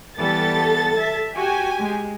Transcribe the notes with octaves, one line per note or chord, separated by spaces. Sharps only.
E3 G3 B3 A4 A6
E5
F#4 G4 G#5
G#3